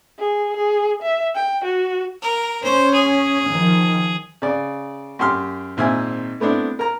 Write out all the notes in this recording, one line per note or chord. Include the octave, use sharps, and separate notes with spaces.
G#4
G#4
E5
G5
F#4
A#4
C#4 C5
G#4
D#3 F3
C#3 D5
F#2 G4 C6 F6
G#1 A#2 C4 E5 G#5
A3 B3 C4 D4 E4
A#4 A#5